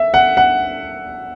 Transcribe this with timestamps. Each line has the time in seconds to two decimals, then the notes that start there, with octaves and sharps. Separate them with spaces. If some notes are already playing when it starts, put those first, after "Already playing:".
Already playing: E5
0.14 F#5
0.37 F#5